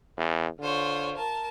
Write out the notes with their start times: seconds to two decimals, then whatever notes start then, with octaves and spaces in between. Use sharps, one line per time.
0.17 E2
0.59 D3 F4 C5 C#5
1.15 A#4 A5